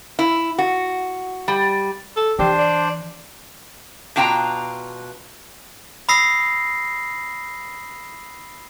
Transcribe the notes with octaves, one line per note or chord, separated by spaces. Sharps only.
E4
F#4
G3
A4
E3 D4 G4 C5
D5
B2 D4 F4 G5 G#5 A#5
B5 D#6 E6 A#6 C7